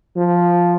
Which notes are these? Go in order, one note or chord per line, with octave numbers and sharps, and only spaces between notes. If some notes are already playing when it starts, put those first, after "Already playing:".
F3